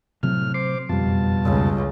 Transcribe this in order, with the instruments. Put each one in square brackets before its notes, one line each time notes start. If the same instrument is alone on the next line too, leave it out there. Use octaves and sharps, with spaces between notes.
[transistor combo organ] A2 F6 [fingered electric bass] C3 F#3 C4
[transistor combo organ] C5 D6 [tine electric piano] C7
[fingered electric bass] F#1 G3 [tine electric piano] F2 [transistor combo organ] B2 F4 A5
[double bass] C#2